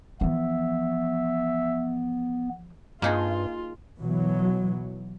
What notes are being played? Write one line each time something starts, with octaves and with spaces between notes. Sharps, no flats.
E3 F3 B3 E5
G2 A#3 D#4 F4 G#4
B2 E3 F#3